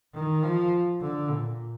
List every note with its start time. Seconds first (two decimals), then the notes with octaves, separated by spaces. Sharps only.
0.13 D#3
0.43 F3
1.01 D3
1.30 A#2